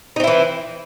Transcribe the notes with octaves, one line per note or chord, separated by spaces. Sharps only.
E3 C4 D#4 E4